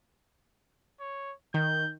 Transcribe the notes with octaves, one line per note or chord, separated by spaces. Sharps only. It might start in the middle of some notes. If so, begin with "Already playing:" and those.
C#5
D#3 G6